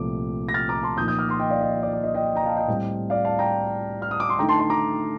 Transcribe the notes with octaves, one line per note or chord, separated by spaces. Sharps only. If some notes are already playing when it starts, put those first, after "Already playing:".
Already playing: C2 A#2 F3 A3 D6
A#6
F6 A6
A#5 D6
A5 C6
A#2 F3 A#3 D#4 D#6 G6
D#6 G6
D6 F6
C6 D#6
D#5 G5
D5 F5
D#5
D#5
D5
D5
D#5
D#5 G5
G5 A#5
F5 A5
D#5 G5
A2 G3 C4
D5 F5
F5 A5
G5 A#5
F6
D#6
D6
C6
D3 A3 D#4 G5 A#5
A5 C6
A5 C6
A#5 D6